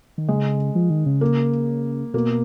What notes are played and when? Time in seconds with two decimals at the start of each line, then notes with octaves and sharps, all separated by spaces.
0.18 D#3
0.29 C#3 G#3
0.75 F3
0.90 D#3
1.06 C#3
1.21 A#3
2.14 B2 A#3